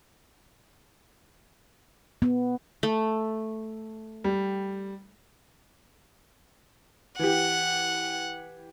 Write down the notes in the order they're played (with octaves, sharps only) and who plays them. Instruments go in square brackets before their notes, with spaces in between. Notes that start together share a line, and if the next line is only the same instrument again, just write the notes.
[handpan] B3
[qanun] A3
[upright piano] G3
[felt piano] E3 G4 [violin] F#5